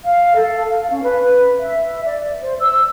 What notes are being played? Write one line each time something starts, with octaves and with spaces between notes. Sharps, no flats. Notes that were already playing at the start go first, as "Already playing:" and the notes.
F5
A4
F5
C#4
B4
E5
D5
C5
E6